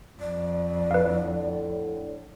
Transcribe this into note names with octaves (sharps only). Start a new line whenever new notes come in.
F2 D5
A2 D3 B4 F5